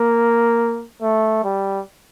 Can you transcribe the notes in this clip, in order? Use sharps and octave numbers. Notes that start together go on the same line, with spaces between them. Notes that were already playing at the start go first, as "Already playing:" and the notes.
Already playing: A#3
A3
G3